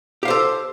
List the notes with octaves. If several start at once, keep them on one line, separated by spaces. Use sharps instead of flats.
G4 A4 C5 F5